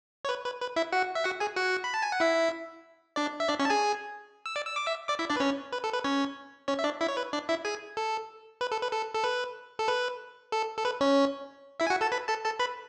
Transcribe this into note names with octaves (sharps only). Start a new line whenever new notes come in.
C#5
B4
B4
B4
E4 E5
F#4 F#5
E5
F#4 F#5
G#4 G#5
F#4 F#5
B5
A5
G#5
F#5
E4 E5
D4 D5
E5
D4 D5
C#4 C#5
A5
G#4 G#5
E6
D5 D6
E6
D6
E5 E6
D5 D6
E4 E5
D4 D5
B4
C#4 C#5
B4
A4
B4
C#4 C#5
C#4 C#5
E5
D4 D5
E4 E5
C#5
B4
D4 D5
E4 E5
G#4 G#5
A4
B4
A4
B4
A4
A4
B4
A4
B4
A4
A4
B4
C#4 C#5
E4 E5
G#5
F#4 F#5
A4 A5
B4 B5
A4 A5
A4 A5
B4 B5